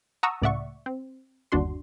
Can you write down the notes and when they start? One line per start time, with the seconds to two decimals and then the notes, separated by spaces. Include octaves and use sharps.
0.23 F#5 A5 A#5 C#6 D#6 E6
0.42 C#2 A2 D5 E5 F#5 C#6
0.86 C4
1.52 G1 D#2 D4 F#4 C6